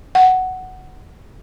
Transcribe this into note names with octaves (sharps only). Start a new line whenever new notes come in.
F#5